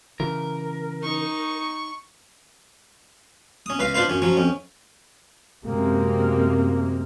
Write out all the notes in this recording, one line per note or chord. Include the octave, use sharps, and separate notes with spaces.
C#3 E3 A#4
D#4 C#6
C#4 D#6
C#2 B4 F5
D4 F4 B4 C5 F5
F#2 C#4
F3 F#3 C#4
F2 C#4
F#2 C3 G#3 A#3